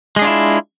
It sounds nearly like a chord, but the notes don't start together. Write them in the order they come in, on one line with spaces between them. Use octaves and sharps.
G#3 G#4 D4 F4 E4